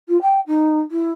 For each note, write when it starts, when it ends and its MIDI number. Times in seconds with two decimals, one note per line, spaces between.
0.08 0.20 65
0.22 0.40 79
0.47 0.81 63
0.91 1.12 64